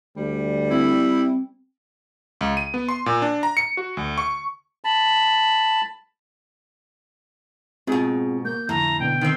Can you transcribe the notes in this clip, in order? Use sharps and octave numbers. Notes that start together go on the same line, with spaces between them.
D2 G3
C4 E4
C#2
D#7
B3
C6
A#2
D4
A#5
C#7
F#4
D2
C#6
A5 B5
G#2 B2 C4 F4 G#4
A#3 G6
F2 A2 D3 A#5
B2 D3 B3 G5
D#3 C4